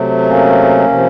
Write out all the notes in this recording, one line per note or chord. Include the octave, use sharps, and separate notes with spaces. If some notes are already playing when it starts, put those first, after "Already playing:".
Already playing: C3 F#3 A3
A#3 C#4
C3 F3